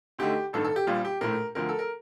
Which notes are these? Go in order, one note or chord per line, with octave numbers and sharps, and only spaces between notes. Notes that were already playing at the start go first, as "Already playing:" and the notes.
D2 D3 A3 D#4 G4
A1 G2 D#3 A4
A4
G4
A#1 A#2 G3 F4
G4
A#1 A2 A3 A#4
D2 D3 F3 A#4
A4
A#4